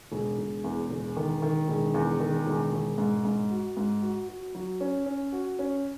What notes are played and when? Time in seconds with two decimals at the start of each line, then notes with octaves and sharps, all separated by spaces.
0.12 E1
0.38 E1
0.64 E2
0.90 E1
1.17 D#3
1.42 D#3
1.68 E1
1.94 E2
2.20 D#3
2.46 E1
2.72 E1
2.98 G#2
3.24 G#2
3.51 F#4
3.77 G#2
4.02 F#4
4.29 F#4
4.55 F#3
4.81 C#4
5.06 C#4
5.32 F#4
5.59 C#4